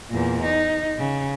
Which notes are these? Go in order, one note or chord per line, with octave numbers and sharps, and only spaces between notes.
E2 A#2
D#4
C#3